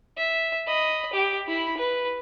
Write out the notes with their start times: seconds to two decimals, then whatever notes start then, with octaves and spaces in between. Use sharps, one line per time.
0.18 E5
0.67 D#5 B5
1.13 G4
1.48 E4 B5
1.78 B4